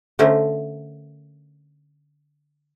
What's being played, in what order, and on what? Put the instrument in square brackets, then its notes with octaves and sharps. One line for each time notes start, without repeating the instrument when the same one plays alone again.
[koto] D3 A3 C#4 A#4 C5